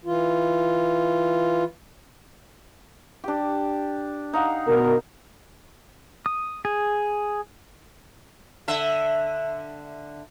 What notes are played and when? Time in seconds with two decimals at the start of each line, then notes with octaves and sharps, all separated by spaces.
0.05 E3 F4
3.24 D4 G4
4.33 D#4 F5 F#5
4.68 B2 A#4
6.26 D#6
6.65 G#4
8.68 D3 E5